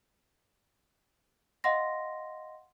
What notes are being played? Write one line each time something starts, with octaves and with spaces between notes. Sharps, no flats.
D#5 F5 F#5 C6 A#6